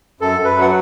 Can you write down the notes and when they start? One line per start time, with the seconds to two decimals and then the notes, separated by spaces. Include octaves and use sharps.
0.21 F#2 A4
0.39 F#2
0.45 B4
0.56 F#3
0.61 F#5